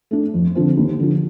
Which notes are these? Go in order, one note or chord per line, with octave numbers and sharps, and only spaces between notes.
A3 D4
F2
D3 F3 C4
D#2
D3 F3